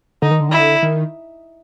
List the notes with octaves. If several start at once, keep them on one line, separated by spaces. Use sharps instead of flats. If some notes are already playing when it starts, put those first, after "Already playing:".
D3 D#4
D#3
D3
D#3 E4
D3
D#3